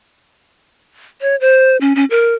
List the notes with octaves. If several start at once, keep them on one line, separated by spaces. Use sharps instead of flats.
C#5
C5
C#4
C#4
A#4